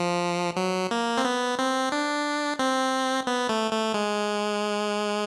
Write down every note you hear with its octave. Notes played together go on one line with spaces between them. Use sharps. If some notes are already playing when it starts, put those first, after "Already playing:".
Already playing: F3
F#3
A#3
C4
B3
C4
D4
C4
B3
A3
A3
G#3